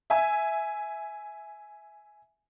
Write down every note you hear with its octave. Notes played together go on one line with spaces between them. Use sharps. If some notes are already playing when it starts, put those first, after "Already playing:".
E5 G#5